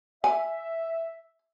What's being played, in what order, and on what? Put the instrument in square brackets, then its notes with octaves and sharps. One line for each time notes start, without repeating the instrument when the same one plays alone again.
[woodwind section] E5 [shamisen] G#5